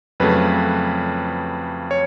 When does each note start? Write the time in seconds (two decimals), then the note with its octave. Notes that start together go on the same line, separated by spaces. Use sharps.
0.20 F2 C#3 F#3 A3 B4
1.91 C#5